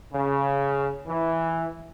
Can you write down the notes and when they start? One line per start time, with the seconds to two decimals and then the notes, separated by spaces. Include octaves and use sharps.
0.13 C#3
1.07 E3